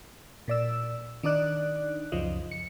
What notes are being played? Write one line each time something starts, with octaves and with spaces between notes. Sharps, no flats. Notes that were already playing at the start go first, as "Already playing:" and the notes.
A#2 D5 E6
D#3 D4 D#4 D5 F#6
C#2 F#2 C#3 F3 D#5
C#7